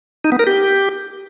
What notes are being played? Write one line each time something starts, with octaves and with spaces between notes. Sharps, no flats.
D#4
B3
A#4
G4